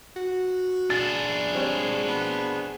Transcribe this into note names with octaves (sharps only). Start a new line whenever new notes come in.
F#4
D4 G#4 A6
G3 C4 C#5
G#3
B3